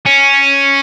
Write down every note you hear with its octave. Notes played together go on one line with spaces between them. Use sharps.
C#4